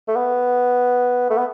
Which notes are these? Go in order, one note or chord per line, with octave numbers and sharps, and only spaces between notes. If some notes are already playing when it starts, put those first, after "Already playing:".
A3
B3
A3
B3